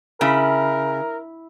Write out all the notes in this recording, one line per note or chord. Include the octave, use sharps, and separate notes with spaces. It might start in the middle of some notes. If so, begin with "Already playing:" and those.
C#3 E4 A#4 B5